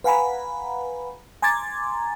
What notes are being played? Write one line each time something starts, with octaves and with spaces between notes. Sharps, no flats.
B4 F5 F#5 G#5 A#5 B5
G#5 A#5 C6 D6 G#6 A6